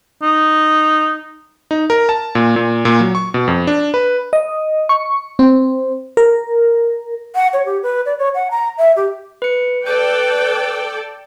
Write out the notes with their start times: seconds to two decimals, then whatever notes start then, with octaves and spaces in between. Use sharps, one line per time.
0.23 D#4
1.71 D#4
1.90 A#4
2.09 A5
2.35 A#2
2.56 A#2
2.85 A#2
3.00 F#3
3.15 C#6
3.34 B2
3.48 F2
3.67 D4
3.94 B4
4.33 D#5
4.89 C#6
5.39 C4
6.17 A#4
7.35 F#5
7.53 C#5
7.65 G4
7.83 B4
8.06 D5
8.19 C#5
8.35 F#5
8.51 A#5
8.78 E5
8.96 G4
9.42 B4 C#7
9.87 A4 B4 D5 G5 G6